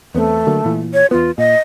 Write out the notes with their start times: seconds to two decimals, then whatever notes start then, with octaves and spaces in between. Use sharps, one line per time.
0.15 E2 A3 B3 C4
0.47 D3 F#3 A#3
0.65 A#2 E3
0.94 C#5
1.11 E2 B3 F4
1.38 A#2 D#5